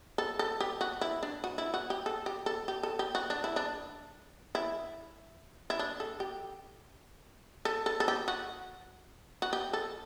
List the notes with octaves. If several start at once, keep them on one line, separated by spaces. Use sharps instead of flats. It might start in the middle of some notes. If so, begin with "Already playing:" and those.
A4
A4
G4
F#4
E4
D4
F#4
E4
F#4
G4
A4
G4
A4
G4
A4
G4
F#4
D4
E4
D4
E4
E4
D4
A4
G4
A4
A4
A4
G4
F#4
F#4
G4
A4